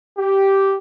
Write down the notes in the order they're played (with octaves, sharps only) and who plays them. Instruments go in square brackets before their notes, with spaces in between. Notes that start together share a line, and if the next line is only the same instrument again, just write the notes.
[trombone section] G4